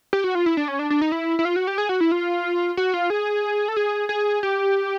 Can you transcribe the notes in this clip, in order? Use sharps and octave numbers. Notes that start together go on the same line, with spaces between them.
G4
F#4
F4
E4
D4
C#4
D4
D4
D#4
E4
E4
F4
F#4
G4
G#4
F#4
E4
F4
F#4
F4
G#4
A4
G#4
G#4
G4